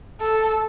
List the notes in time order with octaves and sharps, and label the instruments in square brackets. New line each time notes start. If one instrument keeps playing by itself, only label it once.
[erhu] A4